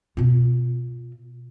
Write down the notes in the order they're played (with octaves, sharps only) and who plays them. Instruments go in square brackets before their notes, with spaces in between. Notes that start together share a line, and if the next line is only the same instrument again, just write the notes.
[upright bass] B2 F4